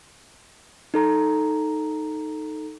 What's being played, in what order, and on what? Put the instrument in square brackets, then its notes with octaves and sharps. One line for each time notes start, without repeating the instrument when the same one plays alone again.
[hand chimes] D#4 A4 A#5